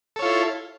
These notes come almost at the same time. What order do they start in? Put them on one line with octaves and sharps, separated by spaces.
A4 C#5 F4 E4